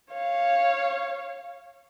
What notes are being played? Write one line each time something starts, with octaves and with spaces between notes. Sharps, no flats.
C#5 F5